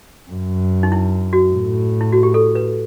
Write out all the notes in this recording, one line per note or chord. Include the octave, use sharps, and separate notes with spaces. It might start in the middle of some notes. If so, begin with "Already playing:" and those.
F#2
D#4
E4
F#4
A2
E4
F#4
G4
A4
B4